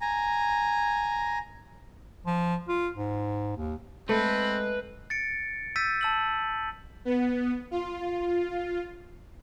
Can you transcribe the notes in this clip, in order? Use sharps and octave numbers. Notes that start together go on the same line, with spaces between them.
G#5 A#5
F3
F4
G#2
D#2
G#3 A3 C4 B4
A6 C#7 D7
E6 G6 A6 B6 D#7
A5 E6 F#7
B3
F4